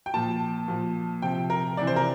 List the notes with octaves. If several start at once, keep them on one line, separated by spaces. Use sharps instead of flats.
G5
A#2 F3 A5
A#2 F3
C3 F3 G5
A#4
C3 E3 D5
C5
A#4